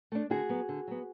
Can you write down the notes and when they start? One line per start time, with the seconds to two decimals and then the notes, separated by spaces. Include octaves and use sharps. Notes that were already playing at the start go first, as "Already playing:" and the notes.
0.12 A3 D4
0.30 D3 F#4 G#4
0.49 F#3 B3
0.69 D3
0.88 F#3 B3